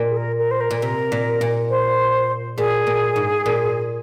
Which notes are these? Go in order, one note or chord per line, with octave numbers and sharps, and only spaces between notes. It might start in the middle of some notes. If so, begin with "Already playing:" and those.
Already playing: A#2
G#4
A#4
A#4
C5
A#4
A#2
C3 A#4
A#2
A#2
C5
A#2 G#4
A#2
G#2
A#2